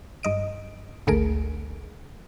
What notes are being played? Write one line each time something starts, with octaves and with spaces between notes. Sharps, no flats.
G2 D#5 D7
G#1 D2 A3 G#4 A#4 D7